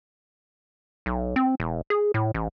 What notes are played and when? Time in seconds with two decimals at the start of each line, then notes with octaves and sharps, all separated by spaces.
1.06 B1
1.36 C4
1.60 E1
1.90 G#4
2.14 A2
2.34 A1